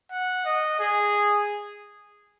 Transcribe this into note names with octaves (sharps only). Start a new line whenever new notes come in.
F#5
D#5
G#4